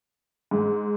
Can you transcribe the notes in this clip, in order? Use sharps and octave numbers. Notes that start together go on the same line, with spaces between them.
G#2